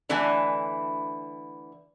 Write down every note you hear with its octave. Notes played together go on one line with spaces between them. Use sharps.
D3 E3 A3 E4 G#5